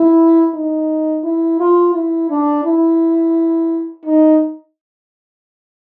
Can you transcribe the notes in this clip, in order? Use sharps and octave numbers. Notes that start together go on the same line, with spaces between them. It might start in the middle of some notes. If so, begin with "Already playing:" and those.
Already playing: E4
D#4
E4
F4
E4
D4
E4
D#4